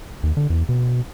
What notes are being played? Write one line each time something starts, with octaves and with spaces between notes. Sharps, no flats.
D#2
D3
E2
B2